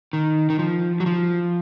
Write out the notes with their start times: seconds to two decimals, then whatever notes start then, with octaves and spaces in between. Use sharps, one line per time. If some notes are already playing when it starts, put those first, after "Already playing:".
0.13 D#3
0.50 D#3
0.59 F3
1.00 F#3
1.06 F3